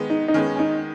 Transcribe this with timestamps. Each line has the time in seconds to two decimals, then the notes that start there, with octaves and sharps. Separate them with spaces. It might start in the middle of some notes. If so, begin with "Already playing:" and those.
Already playing: D#3 G#3 B3
0.10 D#4
0.28 D#4
0.34 D#3 G#3 B3 C#4
0.56 C#4
0.59 D#4